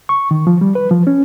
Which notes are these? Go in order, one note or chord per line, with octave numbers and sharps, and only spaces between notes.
C#6
D#3
F3
G3
B4
F3
C#4